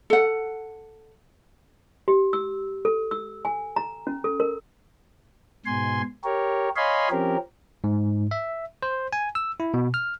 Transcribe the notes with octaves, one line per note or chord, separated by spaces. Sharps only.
A4 F#5
G4
E6
A4
E6
G#5
A#5
C#4
A4
A#4
G#2 B2 G#5 C6
G4 A#4 C#5
C#5 D#5 F5 G#5 B5 C6
F3 C4 C#4 G4 A#4
G#2
E5
C5
G#5
E6
E4
B2
F6